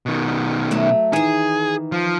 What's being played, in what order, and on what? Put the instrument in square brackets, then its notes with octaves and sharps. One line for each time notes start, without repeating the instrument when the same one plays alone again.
[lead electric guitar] B2 D#3
[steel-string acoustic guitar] F#3 A3
[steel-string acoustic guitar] D#3 E3 [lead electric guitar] G#4
[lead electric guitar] F3